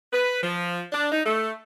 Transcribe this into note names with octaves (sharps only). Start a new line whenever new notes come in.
B4
F3
D4
D#4
A3